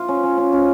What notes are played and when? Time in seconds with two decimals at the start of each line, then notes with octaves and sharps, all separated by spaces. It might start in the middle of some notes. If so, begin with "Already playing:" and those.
Already playing: F4
0.08 C#4
0.23 C#4
0.38 C#4
0.52 C#4